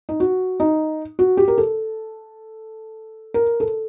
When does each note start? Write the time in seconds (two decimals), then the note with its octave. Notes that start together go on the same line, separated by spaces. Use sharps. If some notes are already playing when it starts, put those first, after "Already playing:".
0.09 D#4
0.20 F#4
0.60 D#4
1.19 F#4
1.37 G4
1.48 A#4
1.58 A4
3.34 A#4
3.60 A4